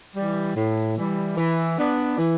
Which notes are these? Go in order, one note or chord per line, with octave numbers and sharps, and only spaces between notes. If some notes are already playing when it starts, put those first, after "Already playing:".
E3 G3
A2
E3 G3
E3
B3 D4
E3